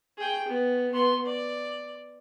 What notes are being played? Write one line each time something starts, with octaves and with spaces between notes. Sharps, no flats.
G#4 G5
B3
B3 C6
D5